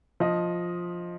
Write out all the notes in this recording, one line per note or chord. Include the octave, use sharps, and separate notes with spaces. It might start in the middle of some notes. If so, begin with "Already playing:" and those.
F3 D#5